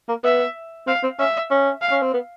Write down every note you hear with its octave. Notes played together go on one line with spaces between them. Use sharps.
A#3
B3 E5
C4 F5
C4
C#4 E5
C#4
F5
C#4
C4
B3